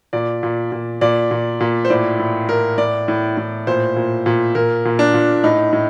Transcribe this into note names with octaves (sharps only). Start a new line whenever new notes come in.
A#2 D5
A#2
A#2
A#2 D5
A#2
A#2
C5
A2 D5
A2
A2 A#4
A2 D5
A2
A2
A#2 C5
A#2
A#2
A#2 A#4
A#2
D4
A#2
A2 D#4
A2